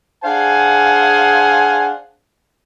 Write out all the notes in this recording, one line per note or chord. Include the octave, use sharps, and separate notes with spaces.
D4 G#4 C5 F5 F#5 G#5